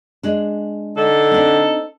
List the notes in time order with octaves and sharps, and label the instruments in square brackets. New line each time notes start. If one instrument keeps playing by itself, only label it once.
[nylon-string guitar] G#3 D4
[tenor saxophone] D3 [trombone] D#4 [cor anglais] A4
[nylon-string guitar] C4 D4